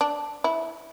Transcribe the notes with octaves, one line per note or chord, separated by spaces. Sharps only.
D4
E4